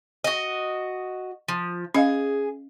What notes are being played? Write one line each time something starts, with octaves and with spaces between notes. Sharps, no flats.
F#4 D#5
F3
C#4 G#4 D#5 F5